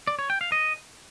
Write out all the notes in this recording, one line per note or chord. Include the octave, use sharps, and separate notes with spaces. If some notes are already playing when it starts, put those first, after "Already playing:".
D5
C#5
G5
F5
D#5